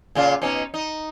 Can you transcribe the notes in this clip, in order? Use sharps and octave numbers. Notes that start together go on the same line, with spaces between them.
A#2 C#3 F4
B2 C#4 D#4
D#4